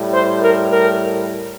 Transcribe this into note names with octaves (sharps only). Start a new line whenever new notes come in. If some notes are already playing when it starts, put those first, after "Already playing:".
Already playing: A2 G3
C5
A#4
A#4